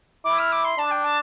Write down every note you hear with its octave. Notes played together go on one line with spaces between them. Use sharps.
E4 D6
F6
D6
C6
D4 A5
G5
A5